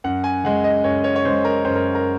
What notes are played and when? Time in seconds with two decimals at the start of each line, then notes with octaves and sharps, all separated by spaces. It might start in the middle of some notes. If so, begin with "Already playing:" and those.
0.04 F#2 F#5
0.24 G#5
0.44 C#3 G#3 F#5
0.64 D#5
0.84 F#2 C#5
1.04 C#5
1.16 C#5
1.25 C#3 G#3 C5
1.45 A#4
1.65 F#2 C5
1.75 A#4
1.95 A#4